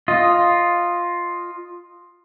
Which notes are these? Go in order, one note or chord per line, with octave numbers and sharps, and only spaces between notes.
F4 D#5